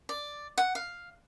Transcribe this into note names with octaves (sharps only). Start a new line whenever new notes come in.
D5
F#5
F5